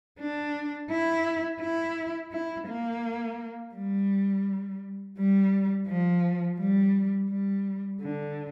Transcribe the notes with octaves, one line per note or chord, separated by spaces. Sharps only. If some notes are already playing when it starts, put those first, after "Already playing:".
D4
E4
E4
E4
A#3
G3
G3
F3
G3
G3
D3